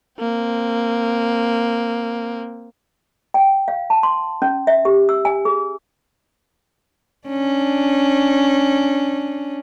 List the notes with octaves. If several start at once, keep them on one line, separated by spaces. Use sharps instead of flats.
A#3 C4
G5
F5
A5
C6
C#4
E5
G4
E6
G#5
G#4
C#4 D4